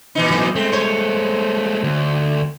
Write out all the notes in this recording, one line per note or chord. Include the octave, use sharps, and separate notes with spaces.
A#2 E3 D#4
F#3 C4
G#3 A3 C4
C5 C#5
D2